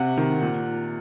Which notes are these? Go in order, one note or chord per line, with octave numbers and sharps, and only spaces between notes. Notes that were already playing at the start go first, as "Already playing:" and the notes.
Already playing: C3 F#5
D#3
A#2